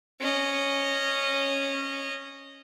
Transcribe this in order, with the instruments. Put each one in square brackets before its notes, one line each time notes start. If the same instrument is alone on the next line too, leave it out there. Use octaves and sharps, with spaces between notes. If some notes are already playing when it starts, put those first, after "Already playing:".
[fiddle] C#4 D#5